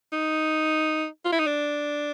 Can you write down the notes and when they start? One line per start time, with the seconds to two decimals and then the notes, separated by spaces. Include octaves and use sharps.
0.12 D#4
1.25 F4
1.32 E4
1.39 D#4
1.46 D4